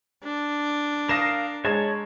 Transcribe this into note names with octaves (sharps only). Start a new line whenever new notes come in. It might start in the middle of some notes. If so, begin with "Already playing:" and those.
D4
A#4 F5 D#6 A#6 C7 E7
G#3 C#5 A5 A#5 G#6